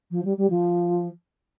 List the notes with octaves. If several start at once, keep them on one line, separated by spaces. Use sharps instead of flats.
F3
G3
G3
F3